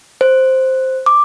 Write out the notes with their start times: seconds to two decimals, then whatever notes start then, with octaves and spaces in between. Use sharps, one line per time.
0.21 C5
1.06 D6